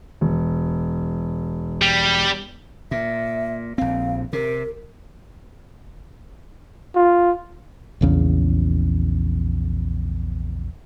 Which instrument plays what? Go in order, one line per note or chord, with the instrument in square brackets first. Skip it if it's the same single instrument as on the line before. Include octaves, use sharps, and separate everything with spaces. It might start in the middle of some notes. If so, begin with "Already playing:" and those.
[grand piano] E1
[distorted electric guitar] G3
[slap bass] A#2 [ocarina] E5
[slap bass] A#1 C4 [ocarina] F5
[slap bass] C3 [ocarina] A#4
[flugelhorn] F4
[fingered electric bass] A#1 E2 C#3